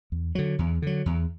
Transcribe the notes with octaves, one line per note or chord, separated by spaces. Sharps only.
E2
D3 F#3
E2
D3 F#3
E2